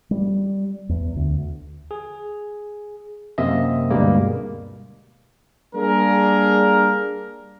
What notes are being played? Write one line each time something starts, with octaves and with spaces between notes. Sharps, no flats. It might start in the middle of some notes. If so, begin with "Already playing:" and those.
G3
E2
D2
G#4
F#2 C3 A#3 C4 D#5 E5
D2 G2 B2 G3 G#3 A#3
G3 A#3 D4 G#4 A#4